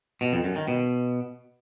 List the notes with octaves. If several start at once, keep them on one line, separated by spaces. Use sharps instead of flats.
B2
F2
F#2
D#3
B2